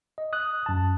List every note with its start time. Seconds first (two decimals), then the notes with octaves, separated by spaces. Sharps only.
0.18 D#5
0.33 D#6 F#6
0.66 F#2 A5